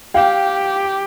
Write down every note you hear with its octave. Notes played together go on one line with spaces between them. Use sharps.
G4 F5 G5